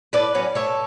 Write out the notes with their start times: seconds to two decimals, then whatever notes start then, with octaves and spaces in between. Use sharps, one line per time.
0.13 A2 B4 D5
0.35 F#3 C#4
0.55 A2 A4 C#5